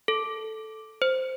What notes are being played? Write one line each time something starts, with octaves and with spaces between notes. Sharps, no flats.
A4
C5